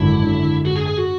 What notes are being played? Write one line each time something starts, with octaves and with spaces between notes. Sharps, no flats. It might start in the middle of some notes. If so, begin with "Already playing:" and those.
Already playing: G#1 F#2 D3 E4
F#4
G#4
G#4
F#4